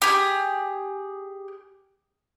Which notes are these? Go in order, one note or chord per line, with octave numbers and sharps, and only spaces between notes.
G4 G#4